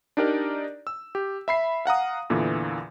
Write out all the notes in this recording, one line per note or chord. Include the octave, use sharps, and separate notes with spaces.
D4 D#4 G4 A#4 D5
E6
G4
E5 B5 C7
F5 F#5 A#5 D#6
E2 A#2 D3 E3